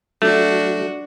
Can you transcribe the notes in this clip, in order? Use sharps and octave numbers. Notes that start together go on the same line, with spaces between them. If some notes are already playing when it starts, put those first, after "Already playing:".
F#3 A3 D4 F#4